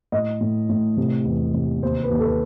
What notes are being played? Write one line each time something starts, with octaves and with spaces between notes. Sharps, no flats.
A2 D#5
A2
A2
C3
E2
C3
D#2 C5
B4
D#2
A4
B4